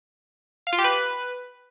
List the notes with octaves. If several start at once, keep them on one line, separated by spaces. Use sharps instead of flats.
F5
F4
G4
B4